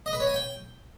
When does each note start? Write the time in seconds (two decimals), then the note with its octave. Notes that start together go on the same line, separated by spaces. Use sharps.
0.06 D#5
0.13 B4
0.20 C#5
0.27 G#5
0.34 G5